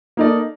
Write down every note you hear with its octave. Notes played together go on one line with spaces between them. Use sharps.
A#3 D#4 A4 D5